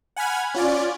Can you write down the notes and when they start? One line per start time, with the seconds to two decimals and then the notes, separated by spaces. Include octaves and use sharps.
0.16 F#5 G#5 B5 F6 G#6
0.54 C#4 F4 D5